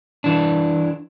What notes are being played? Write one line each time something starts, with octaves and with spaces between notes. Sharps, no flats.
E3 D4